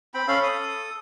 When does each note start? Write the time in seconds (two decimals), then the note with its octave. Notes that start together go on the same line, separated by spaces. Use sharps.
0.14 C4 G5 B5
0.28 C#4 A4 F5 B5
0.43 D#6